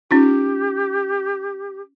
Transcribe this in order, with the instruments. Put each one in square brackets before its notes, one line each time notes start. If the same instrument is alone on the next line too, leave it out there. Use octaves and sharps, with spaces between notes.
[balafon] C#4 D#4 F4 [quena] G4